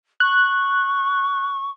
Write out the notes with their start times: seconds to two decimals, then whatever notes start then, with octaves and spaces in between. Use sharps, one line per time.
0.20 C#6 F#6